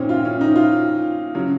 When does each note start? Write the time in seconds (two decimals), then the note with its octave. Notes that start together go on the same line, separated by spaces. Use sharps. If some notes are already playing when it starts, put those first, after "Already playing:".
Already playing: A#2 C4 C#4 D#4
0.09 F4
0.25 C#4
0.41 D#4
0.56 F4
1.35 C#3 F#3